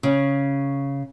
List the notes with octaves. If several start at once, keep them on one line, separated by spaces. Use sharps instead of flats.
C#3